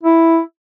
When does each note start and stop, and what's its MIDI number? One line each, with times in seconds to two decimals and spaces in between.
0.03 0.39 64